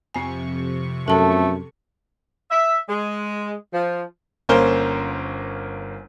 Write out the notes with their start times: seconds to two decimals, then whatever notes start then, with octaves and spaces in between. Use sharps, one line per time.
0.14 F2 C3 C4 G#5 C#6
1.08 F#2 A3 A4 A5
2.51 E5
2.89 G#3
3.73 F3
4.49 G1 A#3 C#4 A#4 C5 G7